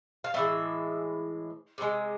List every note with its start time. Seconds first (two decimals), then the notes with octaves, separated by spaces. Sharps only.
0.24 F5
0.34 A2 E3 G#3 E5
1.78 C3 D#3 G#3